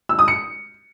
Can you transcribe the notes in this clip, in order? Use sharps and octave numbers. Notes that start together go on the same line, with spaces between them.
E6
D#6
C#7